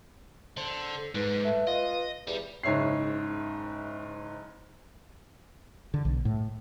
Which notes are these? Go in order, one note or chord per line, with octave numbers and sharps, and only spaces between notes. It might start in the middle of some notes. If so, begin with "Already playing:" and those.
D3 C5
A4
G#2 B4
A3
F4 D#5
E2 G3
F#1 G#2 C#5 E5 C7
D3
B1
A2